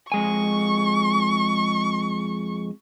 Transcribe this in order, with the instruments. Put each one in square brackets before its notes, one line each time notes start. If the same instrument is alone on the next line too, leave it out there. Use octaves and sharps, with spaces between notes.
[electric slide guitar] F2 G#3 G#5 [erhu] C#6